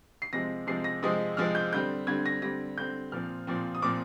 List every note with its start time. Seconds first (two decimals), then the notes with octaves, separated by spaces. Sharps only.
0.22 C7
0.33 C3 F3 G#3 C4 A#6
0.67 C3 F3 G#3 C4 C7
0.84 A#6
1.03 C3 F3 G#3 C4 D#6
1.37 C3 F3 G#3 C4 F6
1.55 G6
1.73 D3 G3 C4 G6
2.07 D3 G3 C4 G#6
2.26 A#6
2.42 D3 G3 C4 A#6
2.78 D3 G3 C4 G6
3.12 A#2 F3 C4 F6
3.47 A#2 F3 C4
3.75 D#6
3.82 A#2 F3 C4 D6